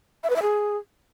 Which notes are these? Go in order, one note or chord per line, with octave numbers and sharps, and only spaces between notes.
E5
B4
E5
G#4